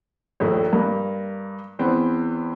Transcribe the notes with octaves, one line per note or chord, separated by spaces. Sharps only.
A#1 D#2 A3
G2 A#3
E2 B3 C4